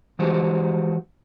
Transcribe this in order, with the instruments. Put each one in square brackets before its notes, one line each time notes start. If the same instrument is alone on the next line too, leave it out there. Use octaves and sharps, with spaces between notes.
[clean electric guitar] E3 F3 G#3 F#4 G4 C5